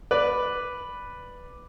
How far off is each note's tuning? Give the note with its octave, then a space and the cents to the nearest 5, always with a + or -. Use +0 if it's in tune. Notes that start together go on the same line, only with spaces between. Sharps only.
B4 +0 D5 +0